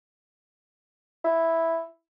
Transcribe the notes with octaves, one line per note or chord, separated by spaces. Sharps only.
E4